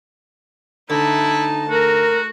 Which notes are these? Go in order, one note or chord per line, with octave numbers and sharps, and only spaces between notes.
D2 D#4 E4 A5
A3 F#4 A#4